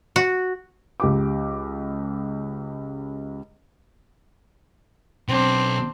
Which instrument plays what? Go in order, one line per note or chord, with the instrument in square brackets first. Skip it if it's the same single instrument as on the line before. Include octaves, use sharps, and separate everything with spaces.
[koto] F#4
[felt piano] C#2 G4 D6
[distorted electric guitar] B1 [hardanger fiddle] C4 D4